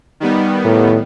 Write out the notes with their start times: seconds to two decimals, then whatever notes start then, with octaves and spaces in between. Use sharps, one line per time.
0.20 D#3 G3 B3
0.65 A2